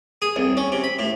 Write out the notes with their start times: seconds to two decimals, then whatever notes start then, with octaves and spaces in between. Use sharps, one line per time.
0.22 G#4
0.36 C2
0.57 C#4
0.72 C3
0.84 B5
0.99 A2